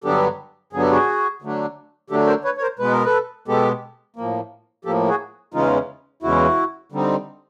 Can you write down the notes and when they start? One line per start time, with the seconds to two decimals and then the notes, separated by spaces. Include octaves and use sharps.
0.04 G2 D3 F#3 B3 D4 G4 A4
0.73 G2 D3 F#3 B3 D4 G#4
0.82 A4
0.91 F#4 G#4
1.42 D3 F#3 A3 D4
2.10 D3 F#3 A3 D4 G4 A4
2.27 A#4 C5
2.44 B4 C#5
2.57 C#5
2.61 A#4 C5
2.79 B2 G#3 B3 B4
2.92 A#4
3.05 A4 B4
3.48 B2 G#3 B3 G4 A4
4.16 A2 F3 A#3
4.85 A2 F3 A#3 G4 A4
5.08 F#4 G#4
5.54 E2 C#3 E3 G#3 C#4 D#4 F4
6.22 E2 C#3 E3 G#3 C#4 E4 F#4
6.92 D3 G3 C4 D#4